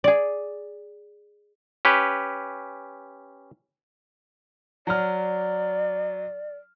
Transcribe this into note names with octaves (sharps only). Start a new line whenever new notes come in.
G#4 D5
C#4 G4 B4
F#3 D5 F6